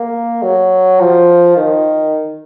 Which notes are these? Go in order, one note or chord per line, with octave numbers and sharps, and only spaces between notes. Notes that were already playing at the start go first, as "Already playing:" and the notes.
Already playing: A#3
F#3
F3
D#3